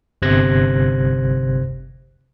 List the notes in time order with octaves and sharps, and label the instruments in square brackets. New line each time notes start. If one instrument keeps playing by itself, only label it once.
[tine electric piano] G1 C3 C5 F#6 G#6 A#6